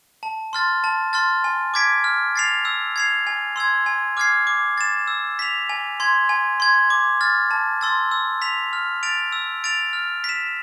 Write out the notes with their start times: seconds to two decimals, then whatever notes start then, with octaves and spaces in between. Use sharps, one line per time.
0.23 A5
0.53 C6 F6 A6
0.84 A5
1.13 C6 F6 A6
1.44 G#5
1.74 D6 G#6 B6 D7
2.04 F6
2.36 A6 C7 F7
2.65 E6
2.96 G#6 C7 F7
3.27 G#5
3.56 C6 E6 G#6
3.86 G#5
4.17 D6 F6 G#6 C7
4.47 D6
4.78 A6 E7
5.08 E6
5.39 B6 F7
5.69 G#5
6.00 C6 G#6
6.29 G#5
6.60 C6 G#6
6.90 D6
7.21 F6 A6
7.51 A5
7.81 C6 E6 A6
8.11 E6
8.42 B6 F7
8.73 F6
9.03 A6 D7 F7
9.32 E6
9.64 A6 D7 F7
9.93 F6
10.24 B6 E7